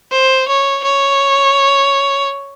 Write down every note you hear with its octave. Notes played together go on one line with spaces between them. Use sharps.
C5
C#5
C#5